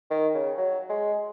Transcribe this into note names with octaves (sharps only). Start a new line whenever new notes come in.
D#3
C#3
F#3
G#3